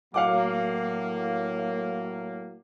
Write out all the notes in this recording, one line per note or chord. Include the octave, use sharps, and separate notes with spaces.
A2 F#3 A#3 F5 F#5 D6